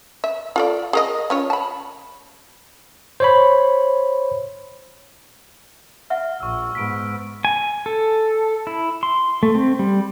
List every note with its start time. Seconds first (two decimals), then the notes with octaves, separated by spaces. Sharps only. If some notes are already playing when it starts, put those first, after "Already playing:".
0.24 E5
0.56 F4 A4 D5
0.93 G#4 A#4 D#5
1.30 C#4 F4 C#5
1.50 A5 B5
3.20 C5 C#5 B5
6.10 E5 F#5 F6
6.40 A#1 C#6 E6
6.75 G#2 B3 B6 D7
7.45 G#5
7.86 A4
8.67 E4
9.03 C6
9.43 A3
9.55 C4
9.79 G3